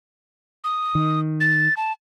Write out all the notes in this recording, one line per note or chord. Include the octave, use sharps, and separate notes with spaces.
D#6
D#3
A6
A5